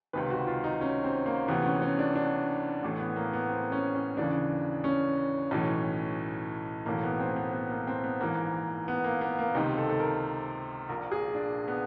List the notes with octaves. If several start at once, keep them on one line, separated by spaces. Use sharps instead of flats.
C#2 C3 D#3 B4
F#4
F4
D#4
C#4
C4
A#3
D2 C3 E3 B3
C#4
C#4
D4
D4
A1 A2 E3
B3
A#3
B3
C4
C#4
C#4
D#2 C#3 E3 D4
C#4
B1 A2 E3
B1 A2 E3 A#3
B3
C4
B3
B3
A#3
C4
B3
A#1 G#2 E3 A#3
B3
A#3
B3
A#3
C#2 C3 D#3 D#4
A4
A4
A#4
A#1 A#2 A#4
G#4
D4
B3